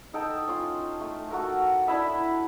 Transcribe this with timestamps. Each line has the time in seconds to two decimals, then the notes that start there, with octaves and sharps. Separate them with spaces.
0.13 D#4 A4 G5
0.48 C#4 F4
1.00 A3
1.31 F#4 A4 A#4
1.87 D4 E4 E5 B5